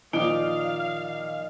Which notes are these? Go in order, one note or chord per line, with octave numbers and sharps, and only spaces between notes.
A#2 D#3 F3 D#4 D5 F5 D7 G7